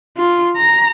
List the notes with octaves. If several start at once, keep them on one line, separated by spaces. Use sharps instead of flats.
F4
A#5